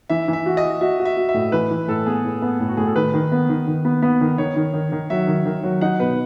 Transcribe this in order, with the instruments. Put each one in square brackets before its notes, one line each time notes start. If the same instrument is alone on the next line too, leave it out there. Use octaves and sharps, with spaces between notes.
[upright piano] E3 [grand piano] E5
[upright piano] E3
[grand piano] E5
[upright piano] F#4
[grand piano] D#5
[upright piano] F#4
[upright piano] F#4 [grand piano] E5
[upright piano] F#4
[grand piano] E5
[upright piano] F#4
[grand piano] E5
[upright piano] A2
[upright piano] E3 [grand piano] B4
[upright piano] E3
[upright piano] A2 [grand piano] A4
[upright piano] B3 [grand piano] G#4
[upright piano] A2
B3
A2
[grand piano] F#4
[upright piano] A2 [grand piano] G#4
[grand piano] A4
[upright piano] D#3 [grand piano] B4
[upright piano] D#3
B3
D#3
D#3
B3
B3
D#3
[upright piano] D#3 [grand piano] C#5
[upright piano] D#3
D#3
D#3
[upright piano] F#3 [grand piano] E5
[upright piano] D#3
D#3
F#3
[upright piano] D#4 [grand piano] F#5
[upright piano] B2 [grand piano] B4